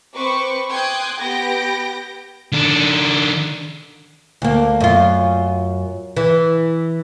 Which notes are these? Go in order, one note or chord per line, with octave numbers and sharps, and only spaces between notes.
C4 B4 C5 B5 C#6 D6
G5 C6 D6 D#6 F#6 G#6
B3 G4 G6 A#6 D7
D#3 D4
D2 A#3
F#2 F4
E3